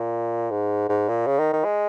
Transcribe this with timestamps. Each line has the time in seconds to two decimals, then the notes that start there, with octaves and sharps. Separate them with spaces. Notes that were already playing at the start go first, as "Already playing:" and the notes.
Already playing: A#2
0.50 G#2
0.89 G#2
1.08 A#2
1.26 C#3
1.39 D#3
1.53 D#3
1.64 G#3